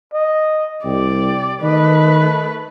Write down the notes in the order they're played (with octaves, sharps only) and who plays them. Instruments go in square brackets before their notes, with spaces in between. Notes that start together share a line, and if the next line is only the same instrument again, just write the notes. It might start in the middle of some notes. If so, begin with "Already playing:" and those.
[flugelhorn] D#5
[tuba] C2 [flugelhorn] G4 [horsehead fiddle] D5
[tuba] D#3 [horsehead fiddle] A3 B4 [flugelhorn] D#5